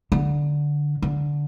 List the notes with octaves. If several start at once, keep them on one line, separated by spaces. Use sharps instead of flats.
D3
D3